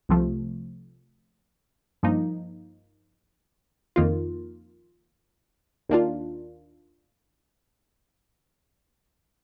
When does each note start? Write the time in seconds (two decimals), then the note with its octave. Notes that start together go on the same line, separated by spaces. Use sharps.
0.09 C2 C3 F3 A3
2.03 G2 F3 A#3 D#4
3.96 F2 D#3 A#3 F4
5.89 D#2 D#3 A#3 D4 F4